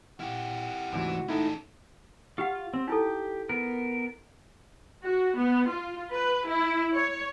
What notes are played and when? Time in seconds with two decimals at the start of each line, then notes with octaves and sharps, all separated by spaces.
0.20 A#2 E4 G4 F5 F#5
0.93 D2 G#2 C3 E3 F#4
1.29 G#3 A3 C#4 D#4 E4 A4
2.38 F4 G4 F5 F#5
2.74 C4
2.88 D#4 E4 G4 A4
3.49 B3 A#4
5.04 F#4
5.37 B3
5.68 F4
6.13 B4
6.48 E4
6.93 C#5